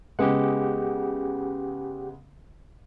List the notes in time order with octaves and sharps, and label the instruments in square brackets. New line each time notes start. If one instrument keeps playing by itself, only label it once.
[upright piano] C#3 G#3 B3 [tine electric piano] G4 G#4 F#5